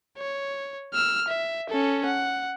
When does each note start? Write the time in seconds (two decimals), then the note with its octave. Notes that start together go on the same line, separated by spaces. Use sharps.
0.18 C#5
0.94 E6 F6
1.28 E5
1.69 C#4 A4
2.05 F#5